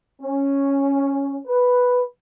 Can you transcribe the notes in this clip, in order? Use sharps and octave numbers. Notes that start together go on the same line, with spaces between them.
C#4
B4